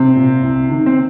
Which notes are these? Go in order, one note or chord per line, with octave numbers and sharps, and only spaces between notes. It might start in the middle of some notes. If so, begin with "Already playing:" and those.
Already playing: C3 C4
A#2
C2
C3 D#3
C4